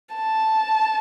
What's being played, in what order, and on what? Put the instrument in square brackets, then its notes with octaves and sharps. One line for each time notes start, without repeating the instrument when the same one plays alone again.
[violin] A5